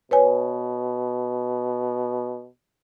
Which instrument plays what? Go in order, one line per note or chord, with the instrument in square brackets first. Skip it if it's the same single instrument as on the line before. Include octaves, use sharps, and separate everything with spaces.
[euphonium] B2 [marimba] B4 C#5 G#5